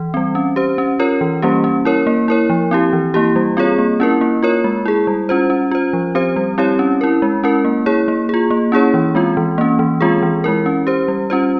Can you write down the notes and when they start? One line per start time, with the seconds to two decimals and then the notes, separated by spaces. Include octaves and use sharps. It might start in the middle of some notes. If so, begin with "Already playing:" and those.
Already playing: E3
0.14 G3 C4
0.35 C#4
0.56 G4 C5
0.78 C#4
0.99 F4 A#4 C#5
1.21 E3
1.42 G3 A#3 C#4 G4
1.64 C#4
1.85 E4 A#4 C#5
2.07 A#3
2.28 E4 A#4 C#5
2.50 F3
2.71 C4 E4 G4
2.93 E3
3.14 A#3 E4 G4
3.36 G3
3.57 C4 F4 G#4 C#5
3.78 A#3
4.00 C#4 E4 A#4
4.21 A#3
4.43 F4 A#4 C#5
4.64 G#3
4.86 E4 G#4
5.07 G3
5.29 C#4 F4 C5
5.50 C#4
5.71 F4 C5
5.93 F3
6.15 C4 G4 C5
6.36 G3
6.58 C4 E4 G4 C#5
6.79 C#4
7.01 E4 A#4
7.22 G#3
7.44 C#4 E4 A#4
7.65 A#3
7.86 E4 G#4 C#5
8.08 A#3
8.29 F4 G#4
8.51 A#3
8.72 C#4 E4 G#4 C#5
8.94 E3
9.15 G#3 C4 F4
9.37 E3
9.58 A#3 C#4
9.79 E3
10.01 G#3 C4 F4 G#4
10.23 E3
10.44 G#3 E4 A#4
10.66 C#4
10.87 G4 C5
11.08 G3
11.30 C#4 F4 C5